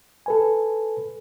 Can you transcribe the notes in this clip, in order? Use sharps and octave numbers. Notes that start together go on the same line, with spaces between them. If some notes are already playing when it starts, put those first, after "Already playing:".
A4 B4 G#5